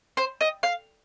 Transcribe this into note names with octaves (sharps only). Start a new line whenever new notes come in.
C5
D#5
F5